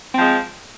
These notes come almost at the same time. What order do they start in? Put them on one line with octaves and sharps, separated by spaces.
C4 F3 G#3